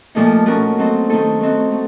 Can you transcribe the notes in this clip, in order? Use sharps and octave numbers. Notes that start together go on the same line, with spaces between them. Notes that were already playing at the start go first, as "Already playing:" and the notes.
A#2 F3 A3 D#4
A3 C#4 F#4 A#4
F#3 C4 D#4 A4 C5
D#3 A3 D#4 A4
A3 C4 D#4 F#4
A3